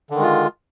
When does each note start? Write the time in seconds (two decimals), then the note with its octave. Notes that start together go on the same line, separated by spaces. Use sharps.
0.10 D3
0.15 D#3
0.19 G#3
0.23 F4